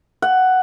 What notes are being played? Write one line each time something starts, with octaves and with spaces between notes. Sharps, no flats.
F#5